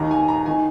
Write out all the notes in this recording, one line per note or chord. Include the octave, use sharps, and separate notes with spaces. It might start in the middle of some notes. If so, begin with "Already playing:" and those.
Already playing: D#2 D#3 A#5
G#5
A#5
D#3 G#5